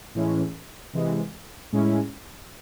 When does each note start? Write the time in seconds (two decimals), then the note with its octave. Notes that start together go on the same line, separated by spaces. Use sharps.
0.15 A2 E3 G#3 C#4
0.93 C3 E3 G#3
1.73 A2 G#3 C#4 E4